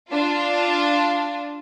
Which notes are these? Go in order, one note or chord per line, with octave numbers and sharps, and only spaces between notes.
D4 F4